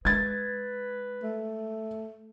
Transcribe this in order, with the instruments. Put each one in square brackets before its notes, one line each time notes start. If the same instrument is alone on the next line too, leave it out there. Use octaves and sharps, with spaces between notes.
[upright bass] G#3 [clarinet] B4 [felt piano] G#6 A6
[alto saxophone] A3